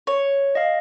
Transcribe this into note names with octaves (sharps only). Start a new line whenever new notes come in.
C#5
D#5 F5